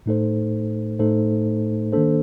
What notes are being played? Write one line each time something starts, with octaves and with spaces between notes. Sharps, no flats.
A2 A3 D#4 A4 C5
A2 A3 D#4 A4 C5
D#3 A#3 D4 A4 C5